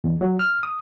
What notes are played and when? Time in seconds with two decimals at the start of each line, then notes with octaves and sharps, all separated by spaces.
0.04 E2
0.21 F#3
0.39 F6
0.63 D#6